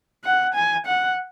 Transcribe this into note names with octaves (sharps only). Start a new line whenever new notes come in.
F#5
G#5
F#5